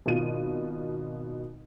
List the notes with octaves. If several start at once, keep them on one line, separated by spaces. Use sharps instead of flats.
G#1 B2 F4 D#7